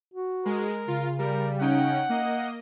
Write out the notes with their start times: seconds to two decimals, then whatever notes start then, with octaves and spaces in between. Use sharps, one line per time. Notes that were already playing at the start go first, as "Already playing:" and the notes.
0.13 F#4
0.46 G#3 A#4
0.88 C#3 F4
1.19 G3 A#4
1.61 C#4 D#4 F#5 G5
2.09 A#3 D#5